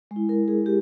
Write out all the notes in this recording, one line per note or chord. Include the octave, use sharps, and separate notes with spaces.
G#3
E4
A#4
G#4
G4